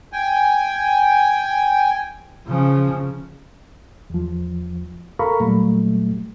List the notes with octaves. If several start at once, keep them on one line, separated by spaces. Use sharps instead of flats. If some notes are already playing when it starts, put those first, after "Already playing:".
G5 G#5
C#3 F3
E2 F3
A4 A#4 F5 A#5 B5 C#6
A#2 F#3 G3 A3